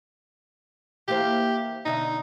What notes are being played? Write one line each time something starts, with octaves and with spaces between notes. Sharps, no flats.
E3 A#3 G4 C5
B2 D3 D#4 E5